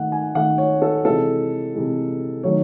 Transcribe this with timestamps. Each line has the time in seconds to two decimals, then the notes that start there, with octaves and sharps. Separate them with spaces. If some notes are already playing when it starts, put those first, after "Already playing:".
Already playing: D#3 A3 F#5
0.12 G#5
0.35 D#3 A3 F#5
0.58 C#5
0.82 A4
1.05 C3 E3 G#3 A4
1.75 C3 E3 G#3
2.43 D#3 F#3 A3 C#5